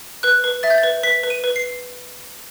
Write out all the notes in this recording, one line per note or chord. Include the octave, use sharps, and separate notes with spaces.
B4 F#6
B4
E5 A6
G6
A6
B4
B4 B6
B4
D#7
B4
C7